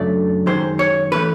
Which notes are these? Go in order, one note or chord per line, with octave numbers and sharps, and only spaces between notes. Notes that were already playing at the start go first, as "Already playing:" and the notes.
Already playing: F#2 C#3 F#3 A3 D4 D5
F#2 D#3 G#3 C5
C#5
E3 A3 C#4 B4